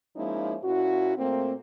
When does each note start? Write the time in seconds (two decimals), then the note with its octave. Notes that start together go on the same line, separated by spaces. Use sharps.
0.16 F3 G#3 A#3 C#4 D#4 E4
0.63 A#2 C#4 E4 F#4
1.17 A#2 A3 A#3 C4